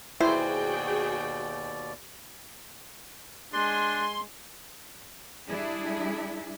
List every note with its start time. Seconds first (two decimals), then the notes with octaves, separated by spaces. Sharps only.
0.21 D#2 B2 E4 F#4 G#4 C5 D5 G5
3.53 G#3 D4 G#5 C6
5.48 G3 D4 E4 G#4